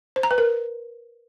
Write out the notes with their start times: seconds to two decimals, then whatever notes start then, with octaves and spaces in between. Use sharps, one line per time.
0.16 C5
0.23 A#5
0.31 B4
0.38 A#4